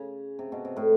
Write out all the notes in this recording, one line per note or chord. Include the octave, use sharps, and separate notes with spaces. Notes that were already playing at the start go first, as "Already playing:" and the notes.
Already playing: C#3
C3
B2
C3
A2